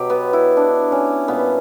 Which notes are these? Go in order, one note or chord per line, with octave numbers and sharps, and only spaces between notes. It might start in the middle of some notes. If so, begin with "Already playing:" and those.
Already playing: B2 F#3 G4
B3
E4
D4
C#4
A#2 G3 B3